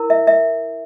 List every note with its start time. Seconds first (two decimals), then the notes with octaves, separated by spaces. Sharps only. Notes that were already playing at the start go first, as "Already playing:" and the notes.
Already playing: E4 A#4
0.10 E5
0.27 E5